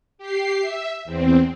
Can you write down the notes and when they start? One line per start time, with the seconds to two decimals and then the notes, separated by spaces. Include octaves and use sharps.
0.18 G4 C7
0.61 E5
1.05 E2 C4